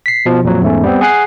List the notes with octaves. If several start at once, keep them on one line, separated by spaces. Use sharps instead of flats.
B6 C7
B2 F3
F2 A#2 F3 F#3
E2 G#2 A3 C#4
G3 B3 C4
G#4 F#5 G#5 F#6 C7